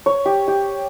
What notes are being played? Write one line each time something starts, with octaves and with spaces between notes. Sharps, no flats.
C#5
G4
G4